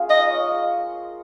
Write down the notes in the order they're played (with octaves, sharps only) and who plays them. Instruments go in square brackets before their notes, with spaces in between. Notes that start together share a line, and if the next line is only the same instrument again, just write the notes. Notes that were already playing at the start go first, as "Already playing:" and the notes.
Already playing: [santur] G#3 A#3 C#4 F4 G#4 F5
[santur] D#4 [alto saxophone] D#5
[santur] C#5 F5
G#3